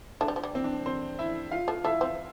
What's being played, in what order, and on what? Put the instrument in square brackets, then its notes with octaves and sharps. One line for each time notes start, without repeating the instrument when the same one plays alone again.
[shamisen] A3 [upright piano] D4
[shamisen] G3
F3
G3
[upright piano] C4
D4
C4 C5
E4 E5
F4 F5
[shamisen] A3
[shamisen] A3 [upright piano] E4 E5
[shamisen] C4